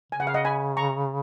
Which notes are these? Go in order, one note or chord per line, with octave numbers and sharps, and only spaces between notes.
C#3 G#5
F#5
F5
D#5 F#5
G#5 B5
A#5 C#6